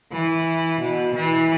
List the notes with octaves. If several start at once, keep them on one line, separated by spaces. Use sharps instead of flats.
E3
B2
E3